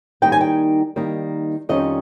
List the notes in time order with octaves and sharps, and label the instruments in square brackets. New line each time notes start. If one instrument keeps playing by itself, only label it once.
[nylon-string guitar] D#3 G3 A#3 D#4 G5
G#5
G5
D#3 G3 A#3 D#4
F2 D#3 G3 C#4 D#5